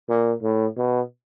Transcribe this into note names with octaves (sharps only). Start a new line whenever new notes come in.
A#2
A2
B2